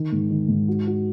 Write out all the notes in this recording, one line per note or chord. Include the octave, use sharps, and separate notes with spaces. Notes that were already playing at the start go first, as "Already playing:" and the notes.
Already playing: D#3
G#2
D#3
G#2
F#4
F#4